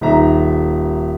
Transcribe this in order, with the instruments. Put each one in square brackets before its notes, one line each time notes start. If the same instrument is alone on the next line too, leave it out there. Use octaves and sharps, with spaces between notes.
[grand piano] D#1 D#3 E5 A#5